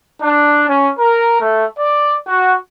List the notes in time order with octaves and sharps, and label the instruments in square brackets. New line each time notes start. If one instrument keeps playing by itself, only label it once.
[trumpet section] D4
C#4
A#4
A3
D5
F#4